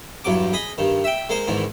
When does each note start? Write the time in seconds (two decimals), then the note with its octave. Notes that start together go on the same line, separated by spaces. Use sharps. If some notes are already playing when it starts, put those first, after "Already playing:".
0.24 E2 G2 F#3 D6
0.53 G#4 D#5 B5
0.78 G2 D#3
1.04 E5 G5
1.29 G#3 A#3 C5
1.48 E2 G#2 D#3 E3